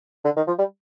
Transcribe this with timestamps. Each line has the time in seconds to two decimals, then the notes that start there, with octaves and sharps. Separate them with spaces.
0.25 D3
0.37 D#3
0.47 F3
0.58 G3